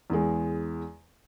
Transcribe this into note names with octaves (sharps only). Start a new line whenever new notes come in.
E2 G#3